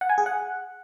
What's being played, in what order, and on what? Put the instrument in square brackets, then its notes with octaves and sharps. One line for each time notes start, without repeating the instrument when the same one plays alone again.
[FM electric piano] F#5
G#5
G#4
F#5